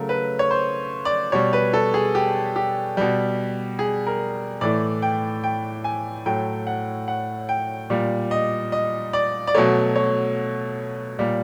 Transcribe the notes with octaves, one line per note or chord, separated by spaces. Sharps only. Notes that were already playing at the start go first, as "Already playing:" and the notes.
Already playing: C#3 F#3 A3 A#4
B4
C#5
C5
D5
B2 G3 C#5
B4
A4
G#4
G4
G4
B2 G3
G#4
A#4
A2 E3 A3 D5
G5
G5
G#5
A2 F#3 A3 G5
F#5
F#5
G5
A#2 G3
D#5
D#5
D5
D5
B2 F#3 A3 C#5
C#5
A#2 G3